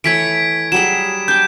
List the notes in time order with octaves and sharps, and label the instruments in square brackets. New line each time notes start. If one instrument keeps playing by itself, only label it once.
[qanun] E3 A3 C#5 [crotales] G#6 B6 D7
[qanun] F#3 G3 G#4 [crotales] E7
[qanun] D4 G5 [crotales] G6